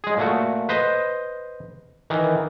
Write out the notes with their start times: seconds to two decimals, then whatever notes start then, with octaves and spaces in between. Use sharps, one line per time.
0.04 G#3 G#4
0.17 A#2 A3 F#4
0.69 B4 C5 D#5
2.10 D#3 E3